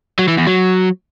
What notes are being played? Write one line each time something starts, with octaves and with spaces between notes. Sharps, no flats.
F#3
E3
E2
F#3